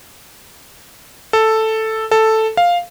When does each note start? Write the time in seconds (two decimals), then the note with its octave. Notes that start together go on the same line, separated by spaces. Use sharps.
1.33 A4
2.11 A4
2.57 F5